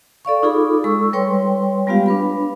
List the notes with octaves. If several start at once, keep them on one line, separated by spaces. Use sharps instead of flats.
A4 D5 F5 C#6
D#4 F4 G#4 A4 B5 D6
G#3 A4 C#6 E6
G3 B4 C#5 G5 C6
G3 G#3 B3 F4 G4 F5
D4 B4 B5